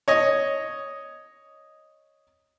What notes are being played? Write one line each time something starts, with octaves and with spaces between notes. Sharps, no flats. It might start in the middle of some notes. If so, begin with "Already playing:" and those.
C#5 D#5